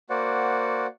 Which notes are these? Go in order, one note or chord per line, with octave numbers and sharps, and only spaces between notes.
A#3 F#4 C5 D5 F#5